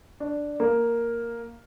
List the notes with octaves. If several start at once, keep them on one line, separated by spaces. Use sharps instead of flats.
D4
A#3